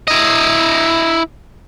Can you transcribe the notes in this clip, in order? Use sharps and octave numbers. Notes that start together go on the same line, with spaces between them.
E4 D#5